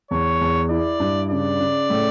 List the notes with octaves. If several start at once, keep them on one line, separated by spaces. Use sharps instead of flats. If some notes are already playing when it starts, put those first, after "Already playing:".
E2 C#5
E2
E4 D5
G2
C#3 D5
C#3
A2